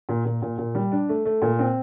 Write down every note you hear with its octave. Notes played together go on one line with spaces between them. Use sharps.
A#2
A#2
A#2
A#2
G3
D4
A3
A3
A#2
C4